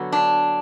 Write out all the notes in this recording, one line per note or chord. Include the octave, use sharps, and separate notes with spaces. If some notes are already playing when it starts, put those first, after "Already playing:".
Already playing: D3 F#3 B3
D4